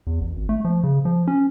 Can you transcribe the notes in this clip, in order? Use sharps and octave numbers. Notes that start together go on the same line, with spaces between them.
E2
A1
G#1
A3
F3
C#3
F3
C#4